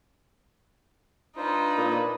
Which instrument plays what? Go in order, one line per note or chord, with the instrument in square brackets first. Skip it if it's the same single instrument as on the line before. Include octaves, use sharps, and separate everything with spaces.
[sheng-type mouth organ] D4 F4 C5 [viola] D#4 B4
[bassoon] A#2